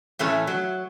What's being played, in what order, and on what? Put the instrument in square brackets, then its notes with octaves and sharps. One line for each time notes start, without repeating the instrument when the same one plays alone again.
[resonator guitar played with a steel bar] A2 E3 A3 C#4
F#3